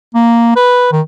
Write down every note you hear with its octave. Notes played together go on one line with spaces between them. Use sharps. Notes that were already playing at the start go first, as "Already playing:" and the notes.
A#3
B4
D#3